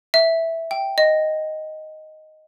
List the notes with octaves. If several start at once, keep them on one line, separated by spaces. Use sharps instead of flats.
E5
G5
D#5